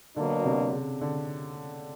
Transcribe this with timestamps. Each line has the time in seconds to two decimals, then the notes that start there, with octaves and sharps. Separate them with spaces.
0.16 B2 D3 F#3 A#3 D4
0.45 C3
0.73 C#3
1.01 D3